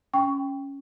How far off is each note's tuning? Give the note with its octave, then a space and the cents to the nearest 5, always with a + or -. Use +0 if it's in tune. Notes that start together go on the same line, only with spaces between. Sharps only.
C#4 +0 G5 +0 C#6 +15